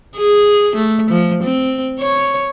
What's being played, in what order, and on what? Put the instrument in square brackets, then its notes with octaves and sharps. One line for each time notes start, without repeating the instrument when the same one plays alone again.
[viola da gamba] G#4
A3
F3
C4
C#5